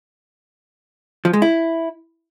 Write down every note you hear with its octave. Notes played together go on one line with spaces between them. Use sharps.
F3
G#3
E4